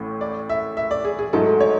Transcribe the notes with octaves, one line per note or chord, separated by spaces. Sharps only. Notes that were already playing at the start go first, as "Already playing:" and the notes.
Already playing: A1 A2
D5
E5
E5
D5
G#4
G#4
G#2 F#3 A3 A4
C#5